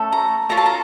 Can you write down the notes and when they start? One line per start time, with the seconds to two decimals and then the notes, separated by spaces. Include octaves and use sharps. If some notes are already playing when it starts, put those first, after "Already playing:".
Already playing: A3 C#4 A4
0.12 A#5
0.49 C#4 F4 A4 A#5
0.57 A5
0.66 A#5